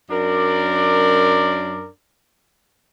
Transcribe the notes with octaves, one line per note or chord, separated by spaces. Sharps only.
F#2 D4 A#4 D5